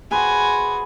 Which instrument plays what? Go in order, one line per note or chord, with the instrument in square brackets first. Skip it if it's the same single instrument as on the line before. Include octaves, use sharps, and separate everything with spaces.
[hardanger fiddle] F#4 G#5 [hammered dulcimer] G#4 B4 C5